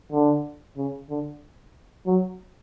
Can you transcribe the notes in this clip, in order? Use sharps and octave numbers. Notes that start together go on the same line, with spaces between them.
D3
C#3
D3
F#3